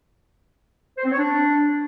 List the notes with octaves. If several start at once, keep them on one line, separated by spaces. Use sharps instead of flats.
C5
C4
C#5
D4